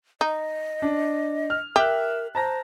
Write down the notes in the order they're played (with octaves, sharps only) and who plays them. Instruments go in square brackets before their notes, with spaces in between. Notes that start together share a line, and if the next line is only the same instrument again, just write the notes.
[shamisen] D#4 [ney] D#5
[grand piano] D4
F6
[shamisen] G4 [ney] A#4 [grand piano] E5 F#6
[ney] C5 [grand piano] A5 A#5 A#6